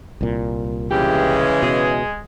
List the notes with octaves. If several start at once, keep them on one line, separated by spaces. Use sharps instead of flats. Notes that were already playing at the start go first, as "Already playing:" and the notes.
C2 A#2
C#3 E3 G#3 G4
B2 G#4